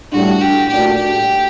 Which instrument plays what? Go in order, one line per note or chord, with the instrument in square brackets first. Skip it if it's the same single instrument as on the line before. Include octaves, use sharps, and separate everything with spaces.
[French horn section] A2 G3 D4 [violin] F#4
[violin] G4
[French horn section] A#2 A3 D4 F#4 [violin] G4
[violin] G4